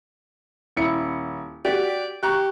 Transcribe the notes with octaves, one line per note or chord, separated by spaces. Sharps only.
D#1 E4 C#7
F#4 G4 D5
G4 A#5 C#6 F#6